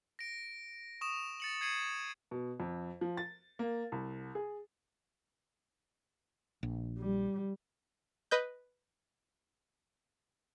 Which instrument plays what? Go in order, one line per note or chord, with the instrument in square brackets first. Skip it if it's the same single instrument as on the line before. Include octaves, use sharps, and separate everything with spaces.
[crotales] A#6 D7
C#6 D#6 E7
A6 C#7 F#7
G#6 C7 C#7 D#7 F#7
[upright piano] B2
F2
F3
A6
A#3
C2
G#4
[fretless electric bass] A#1
[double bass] G3
[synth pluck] B4 D#5 G6